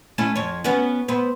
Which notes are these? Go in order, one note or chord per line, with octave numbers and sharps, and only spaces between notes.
A3 C#4 E4
F2 C#5
B3 C#4 F#4
B3 C4